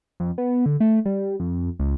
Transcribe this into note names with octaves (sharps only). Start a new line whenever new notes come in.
F2
B3
D3
A3
G3
F2
C#2